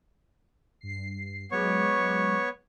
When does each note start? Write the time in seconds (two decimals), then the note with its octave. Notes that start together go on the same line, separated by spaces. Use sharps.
0.81 G2 C7
1.52 F#3 G#3 B3 C#5 C#6 D6